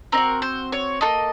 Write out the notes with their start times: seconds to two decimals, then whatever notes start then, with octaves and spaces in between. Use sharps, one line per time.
0.12 C4 D#4 A#4
0.17 F#4
0.42 C5
0.72 C#5
1.01 A#3 F4 A4 D#5